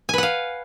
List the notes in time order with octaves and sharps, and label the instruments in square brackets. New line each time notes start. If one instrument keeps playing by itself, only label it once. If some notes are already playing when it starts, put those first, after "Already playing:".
[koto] G#5
B4
F#5
F5